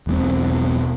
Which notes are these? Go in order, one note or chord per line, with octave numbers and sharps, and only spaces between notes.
E1 B1 E2 C4